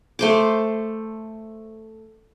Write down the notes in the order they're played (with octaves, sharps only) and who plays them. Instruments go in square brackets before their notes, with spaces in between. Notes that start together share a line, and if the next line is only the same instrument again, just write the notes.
[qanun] A3 C5 D6